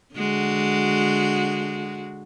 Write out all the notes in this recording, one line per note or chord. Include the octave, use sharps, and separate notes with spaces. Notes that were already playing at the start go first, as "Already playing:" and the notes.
D3 G#3 F#4